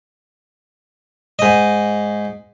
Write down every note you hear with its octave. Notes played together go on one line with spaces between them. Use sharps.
G#2 D#5